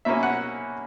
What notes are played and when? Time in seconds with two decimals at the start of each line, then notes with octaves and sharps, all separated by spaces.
0.05 B2 A#3 C#4 E5
0.23 F#5